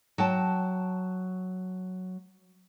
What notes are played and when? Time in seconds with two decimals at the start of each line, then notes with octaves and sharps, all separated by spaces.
0.18 F#3 G5 A5